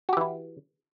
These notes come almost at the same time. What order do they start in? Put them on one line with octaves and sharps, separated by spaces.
F#4 G4 E3 E4